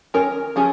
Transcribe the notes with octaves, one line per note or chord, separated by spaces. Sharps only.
D#3 C#4 A#4 C#5
F3 C#4 G#4